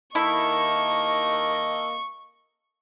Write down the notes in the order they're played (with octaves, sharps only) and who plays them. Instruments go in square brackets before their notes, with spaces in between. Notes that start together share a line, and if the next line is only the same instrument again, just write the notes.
[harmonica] D#3 A#3 D#5 [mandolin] E4 A4 [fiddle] C#6